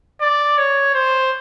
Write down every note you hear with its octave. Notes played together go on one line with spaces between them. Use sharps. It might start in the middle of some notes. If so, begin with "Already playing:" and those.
D5
C#5
C5